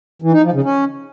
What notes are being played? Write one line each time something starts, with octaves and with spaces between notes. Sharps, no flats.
E3
D#4
F3
C#3
C#4